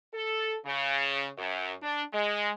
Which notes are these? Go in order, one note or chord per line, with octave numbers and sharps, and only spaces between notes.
A4
C#3
F#2
D4
G#3